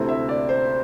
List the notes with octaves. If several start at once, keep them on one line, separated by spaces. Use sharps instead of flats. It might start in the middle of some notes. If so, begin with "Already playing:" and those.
Already playing: D2 C3 A3 C4 E4
E5
D5
C5